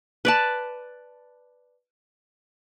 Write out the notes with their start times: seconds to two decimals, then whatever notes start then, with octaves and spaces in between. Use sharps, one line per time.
0.25 B4 D5 A5